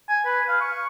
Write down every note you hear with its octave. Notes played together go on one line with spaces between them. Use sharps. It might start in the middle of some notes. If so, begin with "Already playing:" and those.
G#5
B4
F5
C#6